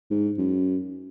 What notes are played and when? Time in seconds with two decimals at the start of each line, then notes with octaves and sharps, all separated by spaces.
0.11 G#2
0.38 F#2